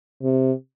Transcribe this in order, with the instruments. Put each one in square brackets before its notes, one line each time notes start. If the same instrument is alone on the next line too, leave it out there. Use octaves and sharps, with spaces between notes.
[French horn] C3